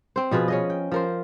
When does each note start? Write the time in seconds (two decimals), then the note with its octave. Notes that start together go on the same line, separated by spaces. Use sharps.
0.16 C4 C5
0.31 B2 F3 G#4 B4
0.48 C#4 G#4 D#5
0.70 G5
0.92 F3 A#4 C5